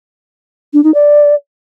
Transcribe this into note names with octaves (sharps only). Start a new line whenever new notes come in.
D4
D#4
D5